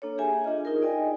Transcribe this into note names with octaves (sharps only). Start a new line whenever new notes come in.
A#3 D4 A4 C#5
G4 G#4 E5 G#5
D4 F4 D#5
D#4 F4 G#4 A#4
D5 D#5 G5 G#5